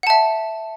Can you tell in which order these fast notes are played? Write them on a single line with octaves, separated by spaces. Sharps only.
F#5 A5 E5